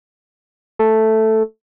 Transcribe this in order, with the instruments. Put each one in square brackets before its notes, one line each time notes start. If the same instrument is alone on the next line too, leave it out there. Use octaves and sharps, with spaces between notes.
[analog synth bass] A3